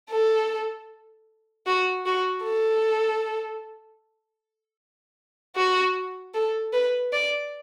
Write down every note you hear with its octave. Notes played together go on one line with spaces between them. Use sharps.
A4
F#4
F#4
A4
F#4
A4
B4
D5